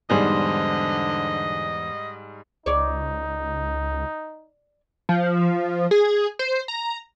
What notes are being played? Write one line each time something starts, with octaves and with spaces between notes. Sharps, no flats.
E2 G#2 D3 G3 G#4 C5 D#5
C#2 D#4 C#5 D5
F3
G#4
C5
A#5